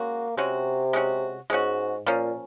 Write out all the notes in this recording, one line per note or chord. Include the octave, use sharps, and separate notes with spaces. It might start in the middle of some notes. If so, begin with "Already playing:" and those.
Already playing: G#3 A#3 C#4 F#4
C3 G#3 C#4 F#4
G#3 C#4 F#4
G#2 G#3 C#4 F#4
A#2 F3 A#3 C#4